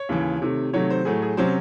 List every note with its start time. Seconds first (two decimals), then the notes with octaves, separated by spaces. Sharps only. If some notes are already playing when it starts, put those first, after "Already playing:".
Already playing: C#5
0.09 D#2 C#3 E3
0.42 C3 D#3 A3
0.73 C3 D#3 F#3 A3 C#5
0.90 C5
1.05 A2 F#3 A3 G#4
1.22 G#4
1.37 C3 F#3 C#4 C5